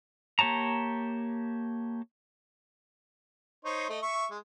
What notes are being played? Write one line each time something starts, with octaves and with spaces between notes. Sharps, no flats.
A#3 G4 C#5 A5 A#5
D#4 C5 C#5
A3 D#5
E5 C#6
G#3